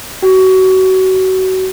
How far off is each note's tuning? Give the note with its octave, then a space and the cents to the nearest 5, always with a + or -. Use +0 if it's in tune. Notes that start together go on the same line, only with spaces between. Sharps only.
F#4 +25 G5 +0